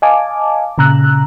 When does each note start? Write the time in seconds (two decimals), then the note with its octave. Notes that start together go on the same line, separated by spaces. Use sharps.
0.02 D#5 F5 G#5 A5 D6
0.78 A#2 C#3 A#5 E6 F#6